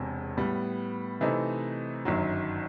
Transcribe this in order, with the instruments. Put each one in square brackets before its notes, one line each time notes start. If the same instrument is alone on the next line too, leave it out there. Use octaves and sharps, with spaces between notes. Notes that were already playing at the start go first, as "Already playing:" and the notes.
Already playing: [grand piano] E1 E2 C3
A2 G3 B3
C3 E3 A3 C4 D#4
G1 F#2 D#3 F#3